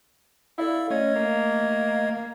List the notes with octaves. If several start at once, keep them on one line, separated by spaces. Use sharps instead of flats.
E4 A4 D5 F5
A3 C#4 D#5 G#6
A#3